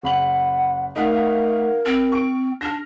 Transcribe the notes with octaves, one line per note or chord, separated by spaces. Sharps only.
F#1 F#5 B5 F#7
A3 D#4 A#4 F5 F#5
C4 F6
C#6 D7
D4 F6 A#6